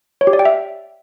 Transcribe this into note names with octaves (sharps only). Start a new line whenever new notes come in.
C#5
G4
D5
G5
E5